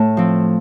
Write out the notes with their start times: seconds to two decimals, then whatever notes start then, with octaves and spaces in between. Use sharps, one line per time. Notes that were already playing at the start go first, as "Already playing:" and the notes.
Already playing: A2 A5
0.17 F3 C4